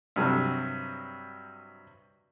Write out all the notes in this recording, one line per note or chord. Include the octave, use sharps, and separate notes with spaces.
G2 C3 F#3